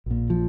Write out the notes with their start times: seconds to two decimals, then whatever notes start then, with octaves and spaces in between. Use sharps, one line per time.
0.06 A#1 A#2
0.30 F3